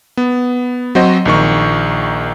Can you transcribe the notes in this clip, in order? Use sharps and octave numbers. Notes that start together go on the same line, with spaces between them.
B3
F#3 C4 F#4 C5 D#5
A#1 D#3 C#6